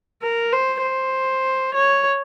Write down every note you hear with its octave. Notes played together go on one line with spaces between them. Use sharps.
A#4
C5
C5
C#5